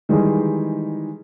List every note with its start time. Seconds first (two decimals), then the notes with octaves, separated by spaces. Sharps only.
0.09 D#3 E3 G3 G#3 G#4